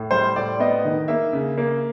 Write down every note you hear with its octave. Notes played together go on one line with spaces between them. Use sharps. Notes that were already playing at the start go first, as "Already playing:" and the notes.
Already playing: A2
G3 C5
A2 D5
B3 D#5
D#3
A#3 E5
C#3
A#3